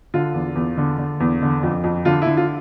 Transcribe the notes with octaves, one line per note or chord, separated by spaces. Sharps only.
D3 F4
E2
E2
D3
D3
E2
D3
F2
F2
D3 F4
D3 E4
F4